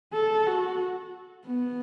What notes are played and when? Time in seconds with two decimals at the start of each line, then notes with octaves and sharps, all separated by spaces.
0.13 A4
0.47 F#4
1.46 B3